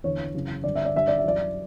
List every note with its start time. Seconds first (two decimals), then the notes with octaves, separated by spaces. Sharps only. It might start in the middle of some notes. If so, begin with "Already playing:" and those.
0.04 E2 D3 C#5
0.34 F#2 C#3 E3
0.64 G2 D3 D5
0.75 E5
0.85 D5
0.95 G2 D3 E5
1.08 D5
1.18 E5
1.24 F#2 E3 D5